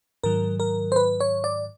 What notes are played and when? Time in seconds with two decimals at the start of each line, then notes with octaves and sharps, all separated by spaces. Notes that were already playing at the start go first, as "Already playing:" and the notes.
0.24 G#2 D#3 F#3 A#4
0.60 A#4
0.92 C5
0.96 B4
1.20 C#5
1.44 D5